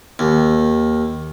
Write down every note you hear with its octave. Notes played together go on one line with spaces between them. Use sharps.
D#2